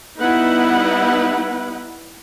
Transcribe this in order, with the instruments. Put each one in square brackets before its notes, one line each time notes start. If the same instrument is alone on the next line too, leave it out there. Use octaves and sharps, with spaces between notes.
[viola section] G3 B3 D#4 E4 B4 F#5